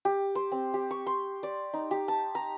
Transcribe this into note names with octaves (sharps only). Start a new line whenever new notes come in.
G4
C5
C4
G4
C#6
C6
D5
D#4
G4
A5
A#5